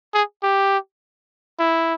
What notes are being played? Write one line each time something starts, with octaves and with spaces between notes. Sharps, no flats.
G#4
G4
E4